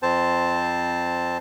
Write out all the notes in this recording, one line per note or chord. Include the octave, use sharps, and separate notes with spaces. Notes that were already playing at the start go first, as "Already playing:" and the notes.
F2 C4 C5 A5